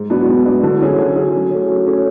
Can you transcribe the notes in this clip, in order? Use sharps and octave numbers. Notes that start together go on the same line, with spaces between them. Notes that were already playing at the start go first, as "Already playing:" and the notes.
Already playing: G#2
F#3 B3 D4 F#4
G#2
F#3 B3 D4 F#4
D3
F#3 C#4 G#4
D3
F#3 C#4 G#4
F#3
A3 C#4
F#3
A3 C#4